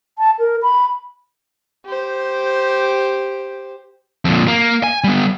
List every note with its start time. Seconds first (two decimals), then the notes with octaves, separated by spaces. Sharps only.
0.18 A5
0.39 A#4
0.62 B5
1.85 G4 C5
4.25 F2 A#2
4.48 A#3
4.84 G#5
5.04 G3 B3